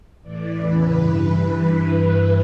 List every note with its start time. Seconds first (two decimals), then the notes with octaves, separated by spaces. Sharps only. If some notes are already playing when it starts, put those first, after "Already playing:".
0.23 A2 E3 D5
0.57 E2 C#3 E3 B4
0.91 G2 E3